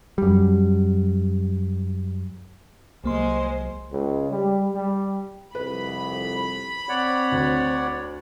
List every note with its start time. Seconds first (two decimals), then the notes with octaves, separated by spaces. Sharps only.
0.18 F#2 G3
3.04 C2 F#3 G#3 A#3 C5 C6
3.92 C#2
4.32 G3
4.73 G3
5.55 C2 F2 B4 B5
6.89 C4 C#5 D5 F#5
7.32 D2